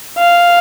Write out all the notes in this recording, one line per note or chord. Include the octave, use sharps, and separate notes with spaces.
F5